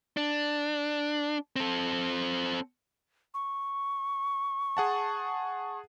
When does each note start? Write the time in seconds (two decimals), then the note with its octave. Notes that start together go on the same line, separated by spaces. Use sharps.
0.17 D4
1.56 C4 A4
3.34 C#6
4.77 G#4 F#5 A5